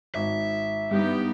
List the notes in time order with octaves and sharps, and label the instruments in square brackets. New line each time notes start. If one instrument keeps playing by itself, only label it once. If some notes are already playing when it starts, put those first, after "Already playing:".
[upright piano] G#1 [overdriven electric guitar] E5
[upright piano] G2 [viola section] B3 D#4 G4